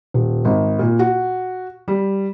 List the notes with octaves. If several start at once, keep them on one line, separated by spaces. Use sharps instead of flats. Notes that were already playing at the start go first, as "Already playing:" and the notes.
D#1
G#1
A#2
F#4
G3